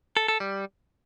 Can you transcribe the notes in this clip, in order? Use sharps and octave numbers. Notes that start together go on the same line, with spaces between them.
A4
A4
G3